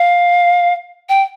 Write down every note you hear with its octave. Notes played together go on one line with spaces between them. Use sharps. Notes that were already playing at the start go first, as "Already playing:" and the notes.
Already playing: F5
G5